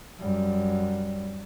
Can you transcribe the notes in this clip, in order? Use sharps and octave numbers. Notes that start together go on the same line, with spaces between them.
F#2 G3